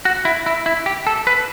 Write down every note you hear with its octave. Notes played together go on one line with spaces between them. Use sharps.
F#4
E4
E4
E4
G4
A4
B4